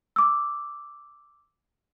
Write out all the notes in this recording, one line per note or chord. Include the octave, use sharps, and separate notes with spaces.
D6 E6